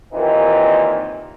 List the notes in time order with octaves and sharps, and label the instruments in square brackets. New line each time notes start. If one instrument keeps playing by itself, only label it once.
[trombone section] D#2 A#2 D#3 E3 C4 D#4